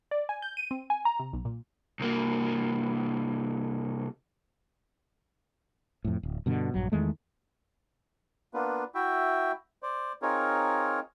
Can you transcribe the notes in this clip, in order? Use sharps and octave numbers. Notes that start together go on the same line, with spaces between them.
D5
G#5
G6
D#7
C4
G#5
A#5
C3
B1
A#2
C2 A#3
F2 A2
D1
G2 B2 D3
A#1 G2 F#3
E2 D#3 G#3 A3
A#3 B3 D4 F4 B4
E4 F#4 E5 G5
C5 D5
C4 D#4 F4 G#4 A#4 C#5